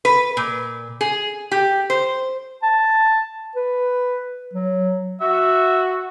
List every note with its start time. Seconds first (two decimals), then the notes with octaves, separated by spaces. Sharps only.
0.05 B4
0.37 A#2
1.01 G#4
1.52 G4
1.90 C5
2.63 A5
3.56 B4
4.54 F#3
5.20 F#4 E5